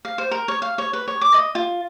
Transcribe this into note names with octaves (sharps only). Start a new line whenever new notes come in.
F5
C5
A#4
C#5
F5
C#5
B4
C#5
D6
D#5
F4